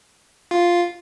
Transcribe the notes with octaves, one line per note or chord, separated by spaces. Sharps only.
F4